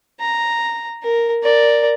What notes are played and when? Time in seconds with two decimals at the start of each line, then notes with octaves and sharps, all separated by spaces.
0.20 A#5
1.03 A#4
1.43 A#4 D5